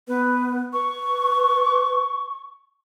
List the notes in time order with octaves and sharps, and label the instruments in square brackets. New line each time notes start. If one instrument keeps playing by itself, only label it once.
[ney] B3 [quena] B4
[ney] B4 [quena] C#6